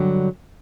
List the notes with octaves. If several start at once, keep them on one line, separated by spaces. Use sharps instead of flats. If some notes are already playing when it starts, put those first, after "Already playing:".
Already playing: G2 D3 F#3 G3 G4